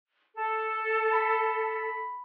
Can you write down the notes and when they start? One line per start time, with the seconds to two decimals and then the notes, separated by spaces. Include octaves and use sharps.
0.35 A4
1.13 B5